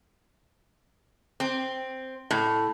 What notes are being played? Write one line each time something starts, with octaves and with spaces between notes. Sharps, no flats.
C4
A2